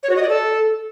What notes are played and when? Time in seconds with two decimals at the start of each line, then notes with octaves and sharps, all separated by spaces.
0.03 C#5
0.10 F#4
0.16 D#5
0.22 D5
0.29 A4